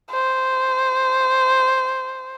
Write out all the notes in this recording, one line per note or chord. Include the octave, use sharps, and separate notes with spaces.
C5